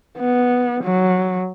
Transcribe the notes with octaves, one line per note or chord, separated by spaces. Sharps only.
B3
F#3